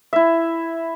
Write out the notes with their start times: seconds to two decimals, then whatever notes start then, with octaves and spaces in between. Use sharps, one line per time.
0.13 E4 E5